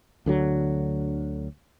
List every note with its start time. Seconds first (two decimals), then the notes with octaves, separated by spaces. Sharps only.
0.26 D2 D3 F#3